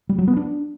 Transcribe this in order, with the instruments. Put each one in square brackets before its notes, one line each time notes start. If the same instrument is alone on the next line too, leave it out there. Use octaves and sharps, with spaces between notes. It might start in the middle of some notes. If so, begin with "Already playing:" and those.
[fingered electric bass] G3
F#3
B3
D4